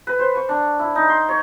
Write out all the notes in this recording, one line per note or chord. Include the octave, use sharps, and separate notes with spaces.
B4
C5
C#6
D4
E4
D#4
C6
C#5